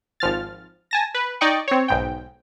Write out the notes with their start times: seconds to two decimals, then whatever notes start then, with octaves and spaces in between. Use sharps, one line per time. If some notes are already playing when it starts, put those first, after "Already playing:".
0.20 G#1 F3 F6 A6
0.91 G#5 A5 A#6
1.14 B4
1.41 D#4 D5 D#5 G5 C#6
1.68 C4 C#5
1.88 B1 G#2 G5